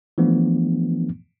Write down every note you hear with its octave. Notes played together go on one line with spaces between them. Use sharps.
E3 F3 A3 B3 D4